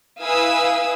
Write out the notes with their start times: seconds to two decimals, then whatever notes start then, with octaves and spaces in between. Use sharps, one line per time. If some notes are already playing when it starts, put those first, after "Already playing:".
0.20 E4 B4 F5 G#5 D#6 E6